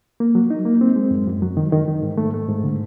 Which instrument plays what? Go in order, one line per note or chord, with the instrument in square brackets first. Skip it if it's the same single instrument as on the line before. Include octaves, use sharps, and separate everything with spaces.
[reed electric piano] A#3
F#3
D#4
A#3
C4
G#3
F#2
F#2
F#3
D#3
D#3
D#3
G#2
A3
A3
G#2
D3